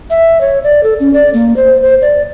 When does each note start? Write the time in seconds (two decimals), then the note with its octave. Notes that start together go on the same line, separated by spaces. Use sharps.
0.10 E5
0.41 C#5
0.64 D5
0.83 A4
1.00 C#4
1.14 D5
1.34 A#3
1.56 C5
1.82 C5
2.02 D5